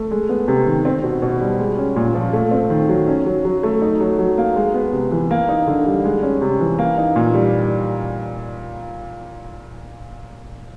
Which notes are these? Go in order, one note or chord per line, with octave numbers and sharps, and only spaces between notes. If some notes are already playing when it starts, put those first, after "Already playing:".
Already playing: A3
G#3
B3
C3
D#3
C4
B2
B2
G3
G#3
C#4
A#2
F3
A3
C4
D#3
F#3
C#4
F#3
F#3
A3
D#4
F#3
F#3
A#3
G#3
B3
C3
E3
A#3
D#4
D3
G3
G#3
C#4
C3
E3
A#3
D#4
A#2
G3